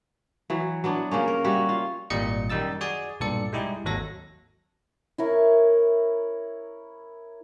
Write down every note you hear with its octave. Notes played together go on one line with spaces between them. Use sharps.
E3 F#3
F#3 B3 D4
C#3 A#3 C#4
A#4
G3 F#4 C#5 E5
F4
G#1 A#2 G3 D#5 C#7
F#2 D#3 G3 D#4 E6 A6
F#4 G#4 D5 G#5
B1 G2 A#2 A4 D5 C#7
G3 G#3 D#4 E4 G4 G#4
G#1 D#2 F#3 A4 A#6
E4 A#4 C#5